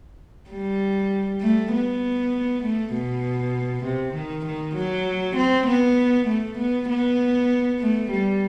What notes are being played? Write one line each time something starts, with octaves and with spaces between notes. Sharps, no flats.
G3
A3
B3
A3
B2
C3
D#3
D#3
F#3
C4
B3
A3
B3
B3
A3
G3